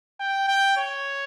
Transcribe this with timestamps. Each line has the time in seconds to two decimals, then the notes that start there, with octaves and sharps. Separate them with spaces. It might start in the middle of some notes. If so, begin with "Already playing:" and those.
0.20 G5
0.48 G5
0.77 C#5